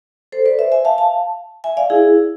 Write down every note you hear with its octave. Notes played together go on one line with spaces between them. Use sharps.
A4 C5
B4 D5
C5 E5
E5 G#5
F5 A5
F5 A5
E5 G#5
D5 F5
E4 G#4